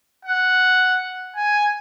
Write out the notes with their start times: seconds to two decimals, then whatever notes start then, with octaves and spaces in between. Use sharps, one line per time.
0.25 F#5
1.36 G#5